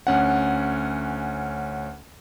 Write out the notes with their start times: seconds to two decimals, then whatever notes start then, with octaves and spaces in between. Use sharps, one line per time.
0.07 D2 C#4 F#5